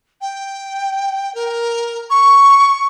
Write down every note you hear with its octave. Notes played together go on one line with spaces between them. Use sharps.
G5
A#4
C#6